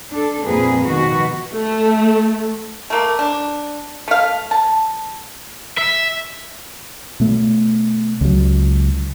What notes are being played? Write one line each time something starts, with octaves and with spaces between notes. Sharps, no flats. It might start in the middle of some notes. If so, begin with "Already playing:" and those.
D4 A4
F2 A#2 A#3 C4 G#4 B4
B2 D#3 F3 F#4 B4
A3
A3 A#3
D4
A3 F5
A5
E5
B2 A3
C#2 F#3